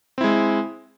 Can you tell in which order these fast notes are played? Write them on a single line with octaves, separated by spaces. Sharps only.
C4 E4 G#3